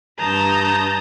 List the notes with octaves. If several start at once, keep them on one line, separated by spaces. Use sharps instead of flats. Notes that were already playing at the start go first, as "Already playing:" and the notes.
G2 A5 A#5 D#6 G6